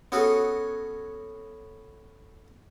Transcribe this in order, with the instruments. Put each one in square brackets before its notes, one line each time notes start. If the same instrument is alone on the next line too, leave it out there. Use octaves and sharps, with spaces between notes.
[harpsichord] B3 C#4 F#4 G#4 A4